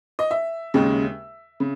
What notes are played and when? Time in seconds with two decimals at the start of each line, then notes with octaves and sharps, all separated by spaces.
0.19 D#5
0.31 E5
0.74 D#2 C#3 G#3
1.60 C#3